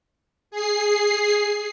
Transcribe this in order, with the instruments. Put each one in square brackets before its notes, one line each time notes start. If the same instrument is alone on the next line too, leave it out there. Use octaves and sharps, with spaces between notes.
[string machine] G#4 C7